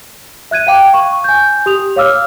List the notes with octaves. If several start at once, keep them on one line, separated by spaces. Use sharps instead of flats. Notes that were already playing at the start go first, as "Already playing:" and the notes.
E5 F#6 G#6 D#7
F5 G5 D6
C#6
G#5 G6
G4 D#6 F7
C#5 F5 D6 E6 F6